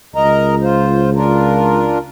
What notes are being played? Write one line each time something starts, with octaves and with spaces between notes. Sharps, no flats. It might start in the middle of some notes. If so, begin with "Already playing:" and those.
C#2 A#4 D#5 A#5
F4 C5
D4 F4 A#4